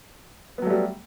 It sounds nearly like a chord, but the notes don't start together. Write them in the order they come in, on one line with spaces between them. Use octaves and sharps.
B3 F#3 A3 G3